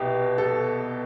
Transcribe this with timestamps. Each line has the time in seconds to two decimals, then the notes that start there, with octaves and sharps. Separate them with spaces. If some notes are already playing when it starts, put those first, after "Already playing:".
Already playing: C2 B2 G4
0.38 A4